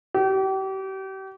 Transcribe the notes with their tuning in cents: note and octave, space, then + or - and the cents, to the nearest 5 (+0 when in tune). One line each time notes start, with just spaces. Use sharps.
G4 -35